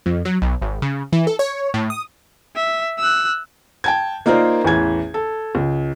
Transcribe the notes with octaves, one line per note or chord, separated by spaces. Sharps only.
F2
F#3
B1
G#1
C#3
E3
A4
C#5
A2
D#6
E5
E6 F#6
G5 A5 G#6
A#3 D#4 F4 A#4 C5 D5
A1 E2 G#6
A4
C#2